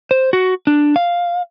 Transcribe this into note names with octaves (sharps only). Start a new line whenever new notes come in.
C5
F#4
D4
F5